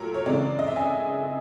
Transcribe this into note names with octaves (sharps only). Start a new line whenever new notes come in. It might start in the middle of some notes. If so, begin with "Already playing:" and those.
Already playing: A#2 F#3 A3 A4 A#4
C#5
C#3 E3 G#3 C4 D5
D#5
E5
G#5